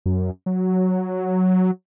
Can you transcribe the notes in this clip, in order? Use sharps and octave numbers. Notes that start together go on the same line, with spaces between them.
F#2
F#3